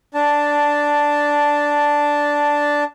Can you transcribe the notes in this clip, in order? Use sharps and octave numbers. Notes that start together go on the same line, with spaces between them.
D4 A5